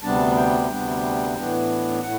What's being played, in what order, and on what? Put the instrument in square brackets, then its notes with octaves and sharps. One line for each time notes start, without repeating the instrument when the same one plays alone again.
[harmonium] D2 C3 G3 B3 D4 A5
G5
D2 C3 G3 B3 D4
A2 E3 B3 D4
A2 F#5